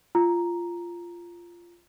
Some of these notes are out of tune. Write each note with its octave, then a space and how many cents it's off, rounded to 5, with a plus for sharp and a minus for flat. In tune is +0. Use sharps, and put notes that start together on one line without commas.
F4 -15 A#5 +0